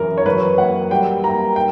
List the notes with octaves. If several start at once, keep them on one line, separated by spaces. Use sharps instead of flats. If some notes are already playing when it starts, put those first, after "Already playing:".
Already playing: F#2 E3 A#4
C#5
F#3 B4
A#3 F#5
G3 G5
A#3 A#5
G5